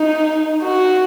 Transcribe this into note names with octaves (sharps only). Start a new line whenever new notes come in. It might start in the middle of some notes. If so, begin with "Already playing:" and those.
Already playing: D#4
F#4